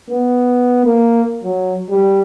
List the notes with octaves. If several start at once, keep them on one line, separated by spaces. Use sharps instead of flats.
B3
A#3
F#3
G3